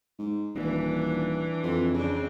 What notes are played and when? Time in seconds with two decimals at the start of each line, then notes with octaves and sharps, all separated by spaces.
0.19 G#2
0.55 D#1 E3 D4
1.63 F2
1.94 F2 C#3 C4 D4